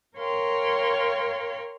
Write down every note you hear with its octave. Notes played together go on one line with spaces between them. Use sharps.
A#4 C#5 F5 G5 C6